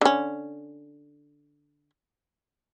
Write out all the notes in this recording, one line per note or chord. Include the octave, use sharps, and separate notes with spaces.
D3 C#4